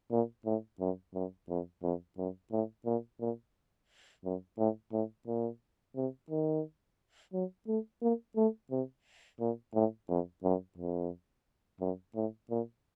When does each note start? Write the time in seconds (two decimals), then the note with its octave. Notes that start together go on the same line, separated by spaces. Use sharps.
0.11 A#2
0.46 A2
0.80 F#2
1.14 F#2
1.49 F2
1.83 F2
2.18 F#2
2.52 A2
2.86 A#2
3.20 A#2
4.24 F#2
4.58 A2
4.92 A2
5.27 A#2
5.96 C3
6.30 D#3
7.34 F#3
7.68 A3
8.02 A#3
8.37 A3
8.71 C3
9.40 A#2
9.74 A2
10.09 F2
10.44 F#2
10.78 F2
11.81 F#2
12.16 A2
12.50 A#2